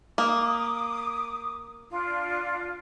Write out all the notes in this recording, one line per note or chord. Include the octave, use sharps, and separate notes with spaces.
A#3 D6 D#6
D4 F4